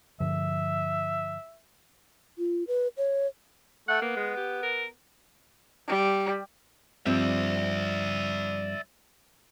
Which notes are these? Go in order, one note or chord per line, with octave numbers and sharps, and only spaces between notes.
G2 D3 F3 E5
F4
B4
C#5
A3 F#5
A#3 B3
G#3
G4
A#4
G3
G2 F3 C4 D5 E5